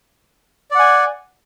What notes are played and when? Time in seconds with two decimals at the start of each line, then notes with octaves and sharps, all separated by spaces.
0.71 D5
0.75 F#5
0.79 G#5